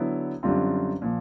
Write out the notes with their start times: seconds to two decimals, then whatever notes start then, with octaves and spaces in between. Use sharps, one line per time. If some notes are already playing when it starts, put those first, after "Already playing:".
Already playing: D3 F#3 B3 E4
0.43 F#2 D3 G3 C4 F4
1.02 A#2 F3